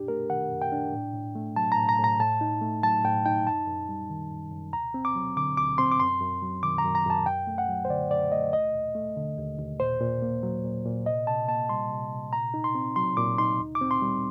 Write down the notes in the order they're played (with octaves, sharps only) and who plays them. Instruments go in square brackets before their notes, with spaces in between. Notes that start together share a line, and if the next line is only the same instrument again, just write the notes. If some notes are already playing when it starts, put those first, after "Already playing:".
Already playing: [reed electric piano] F#2 D4 G4
A3 A#4
D#3 F#5
F#2
G5
D4
A2
A2
A3
F#3 A5
A#5
A2
A#5
A2 A#5
A2 A5
D#4
A3
F#3 A5
A2 G5
D#4 G5
F#2 A5
F#2
G3
D#3
F#2
F#2
D2 A#5
C4
D6
F#3
D3 D6
D2 D6
C4 C6
D6
F#2 C6
F#2
F#3
D#3 D6
A#5
F#2
A#5
F#2 A5
F#2 G5
A3
F#5
F#3
C5
D3 D5
F#2 D5
A3 D#5
D#2 D#5
D#2
A3
D3
D#2
D#2
A#2 C5
A#2
A#3
F#3
A#2
A#2
C3 D#5
C3 A5
A#3 A5
G3 C6
C3
C3
A#2 A#5
D#4
C6
C4
F#3 C6
A#2 D6
D#4 C6
D2
D6
C4
C6
G3